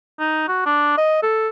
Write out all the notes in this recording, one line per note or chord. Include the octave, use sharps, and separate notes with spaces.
D#4
F#4
D4
D#5
A4